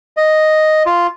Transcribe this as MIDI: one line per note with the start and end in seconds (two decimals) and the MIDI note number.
0.17 0.83 75
0.86 1.07 65